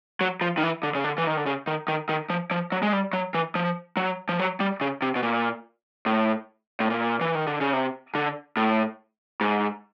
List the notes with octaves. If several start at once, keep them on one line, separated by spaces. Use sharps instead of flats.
F#3
F3
D#3
E3
D3
C#3
D3
E3
D#3
D3
C#3
D#3
D#3
D#3
F3
F3
F#3
G#3
G3
F#3
E3
F3
F#3
F3
F#3
G3
C#3
C3
B2
A#2
A2
A2
A#2
E3
D#3
D3
C#3
C3
D3
A2
G#2